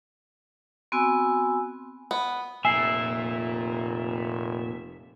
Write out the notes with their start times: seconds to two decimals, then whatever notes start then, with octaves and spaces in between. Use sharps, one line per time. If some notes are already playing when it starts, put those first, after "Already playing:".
0.92 B3 C4 F#4 G#5 E6
2.11 B3
2.65 F1 A#2 E5 G#5 C7